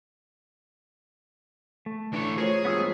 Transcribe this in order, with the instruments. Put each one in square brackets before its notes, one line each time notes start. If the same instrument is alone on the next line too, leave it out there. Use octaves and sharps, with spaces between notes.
[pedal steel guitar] A3
[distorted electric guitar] E3 C#5 [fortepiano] D4
[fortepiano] F3 [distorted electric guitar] G#4 [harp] A#4 C#5
[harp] G2 E3 [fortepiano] F3 G#3 [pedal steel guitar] B3 D#6 E6